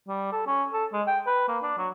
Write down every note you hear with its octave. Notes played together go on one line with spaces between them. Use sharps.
G3
A4
C#4
A4
G#3
G5
B4
A#3
D4
F#3